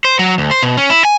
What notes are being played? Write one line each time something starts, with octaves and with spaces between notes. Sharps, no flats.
C5
F#3
D2
C5
B2
C#4
E4
G#5